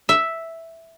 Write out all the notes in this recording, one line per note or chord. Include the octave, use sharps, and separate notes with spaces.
E5